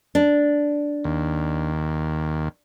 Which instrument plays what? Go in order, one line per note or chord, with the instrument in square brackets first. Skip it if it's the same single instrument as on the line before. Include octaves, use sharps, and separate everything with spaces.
[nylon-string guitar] D4
[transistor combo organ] D#2